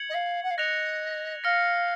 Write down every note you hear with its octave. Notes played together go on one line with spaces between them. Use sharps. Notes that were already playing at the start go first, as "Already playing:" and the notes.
Already playing: G#6 C#7 F#7
D#5
F5
F#5
F5
D#5 F#6 A#6 C#7 F7
F5 F6 A#6 C#7